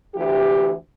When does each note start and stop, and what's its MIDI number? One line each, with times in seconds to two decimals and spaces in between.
0.15 0.72 38
0.15 0.72 52
0.15 0.72 67